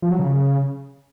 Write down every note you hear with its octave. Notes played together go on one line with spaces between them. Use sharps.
F3
F#3
C#3